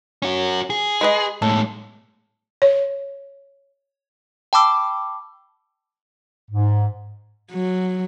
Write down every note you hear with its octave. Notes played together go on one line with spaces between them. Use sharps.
C#4 F#4
G#4
G#3 B4 D#5
A2 G#3 A4
C#5
G5 A5 B5 D6 E6
G#2
F#3